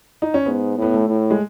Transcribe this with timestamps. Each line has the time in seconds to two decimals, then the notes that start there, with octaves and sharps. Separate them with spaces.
0.22 D#4
0.34 C#4
0.46 G#2 B3
0.78 A2 B3
0.94 A3
1.08 A2
1.30 G#3